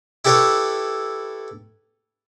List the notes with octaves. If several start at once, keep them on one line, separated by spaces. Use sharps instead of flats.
E4 G4 A4 B4 C#5